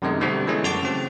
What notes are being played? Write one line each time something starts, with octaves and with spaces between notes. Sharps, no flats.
F#2 C3 D#3 G#3 A3
B2 D3 G3 A3 C4
E3 G#3 A3 C#4
F#2 F#4 A5 D6
C#3 C4